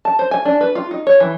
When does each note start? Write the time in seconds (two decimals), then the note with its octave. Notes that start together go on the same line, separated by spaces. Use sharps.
0.05 A5
0.19 C5
0.31 G#5
0.45 D4
0.61 B4
0.75 F4
0.91 D#4
1.07 C#5
1.20 E3